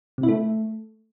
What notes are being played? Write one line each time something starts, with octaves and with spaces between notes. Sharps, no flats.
C3
E4
A3